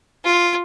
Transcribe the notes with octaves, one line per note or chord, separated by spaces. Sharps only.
F4